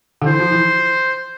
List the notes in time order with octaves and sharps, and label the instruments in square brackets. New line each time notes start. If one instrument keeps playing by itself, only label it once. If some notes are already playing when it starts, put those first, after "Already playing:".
[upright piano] D3
[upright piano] E3 [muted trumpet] C5
[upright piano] F3
E3